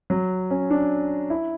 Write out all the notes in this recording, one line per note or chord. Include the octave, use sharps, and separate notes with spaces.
F#3
C#4
D4
E4